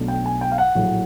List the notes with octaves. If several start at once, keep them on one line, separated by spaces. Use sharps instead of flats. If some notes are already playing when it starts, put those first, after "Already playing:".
Already playing: B1 B2 F#3 A3 D4
G5
G#5
G5
F5
F#5
A#1 A2 F#3 A3